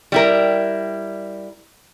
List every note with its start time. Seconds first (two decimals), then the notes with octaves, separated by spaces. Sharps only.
0.12 G3 E4 A#4